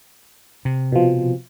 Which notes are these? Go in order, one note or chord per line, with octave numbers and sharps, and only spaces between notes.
C3
B2 F3